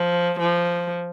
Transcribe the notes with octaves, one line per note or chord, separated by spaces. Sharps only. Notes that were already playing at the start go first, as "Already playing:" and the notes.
Already playing: F3
F3